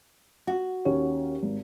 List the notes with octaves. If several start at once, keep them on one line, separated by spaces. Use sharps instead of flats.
F#4
D#2 C#4 C#5
G#1